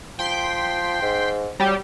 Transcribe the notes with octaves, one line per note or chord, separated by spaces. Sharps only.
F3 G5 C6 B6
G#2
F#3 G3 G4